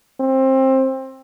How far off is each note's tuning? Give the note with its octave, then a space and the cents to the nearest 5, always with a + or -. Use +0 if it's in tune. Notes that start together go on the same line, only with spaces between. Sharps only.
C4 +20